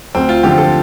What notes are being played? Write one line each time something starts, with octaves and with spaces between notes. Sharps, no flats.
D2 C4
F4
D3 F3 G4
A4